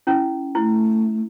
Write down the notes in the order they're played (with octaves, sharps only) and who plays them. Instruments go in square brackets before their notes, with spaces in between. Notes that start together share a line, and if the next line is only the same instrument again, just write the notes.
[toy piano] C#4 E4
[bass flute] A3 [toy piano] E4